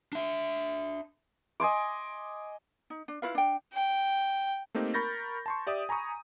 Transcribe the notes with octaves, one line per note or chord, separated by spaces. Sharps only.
D4 E5
D#5 G#5 C6 D6
D#4
D4
E4 F4 B4 F5
D4 G5
G5
A3 A#3 C4 D#4 G4
A#4 B5 C#6 G6 A6 A#6
A5 C6 C#6
G4 D5 E5 D#6
G#5 A#5 B5 C#6 D#6